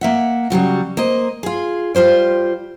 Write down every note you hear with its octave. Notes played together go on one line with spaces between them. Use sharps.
A#3 E5 F#5
C#3 F#3 G3 F#4
A#3 C5 D#5
F4 G#4
G3 F4 C5 D5